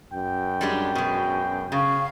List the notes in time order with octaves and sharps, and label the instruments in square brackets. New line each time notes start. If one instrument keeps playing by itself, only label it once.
[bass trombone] F#2 [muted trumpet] G5
[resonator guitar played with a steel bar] G3 G#3 D4
B2 G#3
[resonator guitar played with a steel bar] C#3 [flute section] F5 C#6